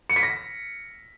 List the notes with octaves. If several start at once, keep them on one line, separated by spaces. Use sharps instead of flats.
C#7
B6
A#6